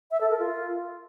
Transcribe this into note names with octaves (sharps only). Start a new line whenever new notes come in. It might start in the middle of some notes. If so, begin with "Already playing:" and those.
E5
A4
A#4
F4